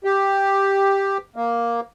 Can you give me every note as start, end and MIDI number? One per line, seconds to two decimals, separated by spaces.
0.04 1.18 67
1.36 1.80 58